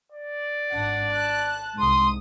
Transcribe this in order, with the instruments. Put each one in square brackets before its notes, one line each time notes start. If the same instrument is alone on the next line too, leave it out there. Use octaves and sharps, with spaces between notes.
[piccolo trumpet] D5
[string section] G#1 D4 F#5
A5 F#6
[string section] C2 G#2 D#6 [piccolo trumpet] C6